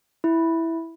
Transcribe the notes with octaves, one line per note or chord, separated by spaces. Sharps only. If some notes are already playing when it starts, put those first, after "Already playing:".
E4